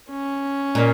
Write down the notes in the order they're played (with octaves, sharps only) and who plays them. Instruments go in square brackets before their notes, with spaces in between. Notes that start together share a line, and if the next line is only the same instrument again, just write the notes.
[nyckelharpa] C#4
[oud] A#2